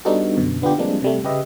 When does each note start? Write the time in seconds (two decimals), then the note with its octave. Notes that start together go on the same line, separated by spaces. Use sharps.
0.05 G3 B3 D4 D#4 F#4 A4
0.37 F#2 B2 D3
0.62 D3 B3 D4 F4 G4
0.78 F3 G3 G#3 A#3 C4 D4
1.02 C3 G3 A3
1.24 C#3 G4 B4 D#5 E5